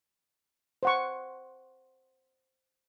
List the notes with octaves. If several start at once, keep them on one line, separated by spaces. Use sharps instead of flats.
C5 F#5 C#6